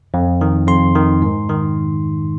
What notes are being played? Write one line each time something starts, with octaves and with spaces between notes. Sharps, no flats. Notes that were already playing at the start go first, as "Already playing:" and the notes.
F2
D#3
F2 C6
D#3
G#2
D#3